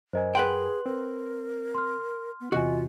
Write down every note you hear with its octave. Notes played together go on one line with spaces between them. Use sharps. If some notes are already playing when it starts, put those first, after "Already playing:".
F#2 A#4 C5 D#5 G#5
G#4 B4 F#5 G5 C6 F#7
C4 A#4
C6 F6
B3
E2 C3 E3 F4 F#4 D#5 G#5